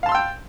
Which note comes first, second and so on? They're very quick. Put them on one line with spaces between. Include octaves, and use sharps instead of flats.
F5 A5 C6 E6 G5